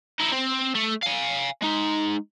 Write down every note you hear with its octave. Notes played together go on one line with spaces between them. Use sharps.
D#4 E4
C4
A3
F5 G#5
G#3 D#4